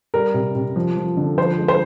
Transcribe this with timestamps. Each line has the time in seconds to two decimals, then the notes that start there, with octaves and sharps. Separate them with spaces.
0.14 G3 A#4
0.34 C3
0.55 C3
0.76 F3
0.97 F3
1.17 D3
1.38 F3 C5
1.59 G#3
1.68 C5